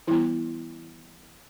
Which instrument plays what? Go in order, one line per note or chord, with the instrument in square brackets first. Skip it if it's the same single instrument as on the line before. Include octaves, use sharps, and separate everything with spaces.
[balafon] E3 G3 B3 E4